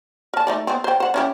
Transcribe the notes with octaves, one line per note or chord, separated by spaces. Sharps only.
A#4 A5
A3 D#4 D5
B3 C4
C5 G5
C5 F#5
C#4 E4 G4